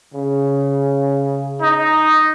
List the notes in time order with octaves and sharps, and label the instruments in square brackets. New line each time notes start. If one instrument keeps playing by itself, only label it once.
[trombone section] C#3
[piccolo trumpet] D#4